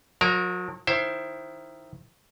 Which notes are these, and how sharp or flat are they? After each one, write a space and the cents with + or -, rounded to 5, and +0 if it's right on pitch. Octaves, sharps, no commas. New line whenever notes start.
F#3 -40 A#4 +0
D#3 +0 E4 +15 C5 +10